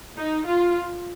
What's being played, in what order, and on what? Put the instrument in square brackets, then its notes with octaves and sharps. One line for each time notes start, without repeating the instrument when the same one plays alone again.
[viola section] D#4
F4